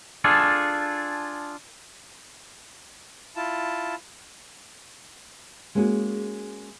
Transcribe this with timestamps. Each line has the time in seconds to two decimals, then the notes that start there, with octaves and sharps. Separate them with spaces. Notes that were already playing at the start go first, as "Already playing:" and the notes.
0.24 D4 F4 G#4 A4
3.36 E4 F4 A5
5.75 G#3 A#3 C#4 F#4 G#4